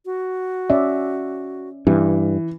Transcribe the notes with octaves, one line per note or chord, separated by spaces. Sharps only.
F#4
C#4 D5 E5
G2 E3